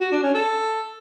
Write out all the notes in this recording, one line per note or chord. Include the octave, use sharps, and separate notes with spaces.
F#4
D4
C#4
A4